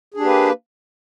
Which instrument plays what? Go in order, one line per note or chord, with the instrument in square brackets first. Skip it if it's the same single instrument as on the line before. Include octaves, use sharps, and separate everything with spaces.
[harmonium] G#4
D4
G4
A#3
B4